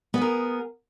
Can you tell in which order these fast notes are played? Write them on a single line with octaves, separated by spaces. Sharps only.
B3 G#4 A#4